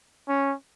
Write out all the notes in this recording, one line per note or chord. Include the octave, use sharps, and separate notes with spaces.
C#4